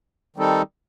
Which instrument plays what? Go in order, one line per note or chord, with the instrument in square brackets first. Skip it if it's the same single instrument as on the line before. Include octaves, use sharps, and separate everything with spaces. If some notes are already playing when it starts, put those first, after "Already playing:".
[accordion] D#3 G3 C4 D#4 A4